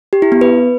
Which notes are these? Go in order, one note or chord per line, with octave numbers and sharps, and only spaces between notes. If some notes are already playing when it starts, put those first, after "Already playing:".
G4
E4
B3
B4